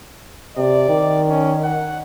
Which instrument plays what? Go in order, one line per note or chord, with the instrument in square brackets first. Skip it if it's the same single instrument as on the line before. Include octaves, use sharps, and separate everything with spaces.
[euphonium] C3 [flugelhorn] D5
[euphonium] D#3
[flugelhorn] C#4
F#5